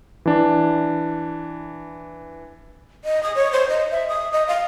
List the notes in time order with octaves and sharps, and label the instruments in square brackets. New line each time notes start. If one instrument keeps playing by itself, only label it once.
[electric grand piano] E3 D4
[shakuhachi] D#5
D#6
C#5
C5
D#5
E5
D#6
D#5
F5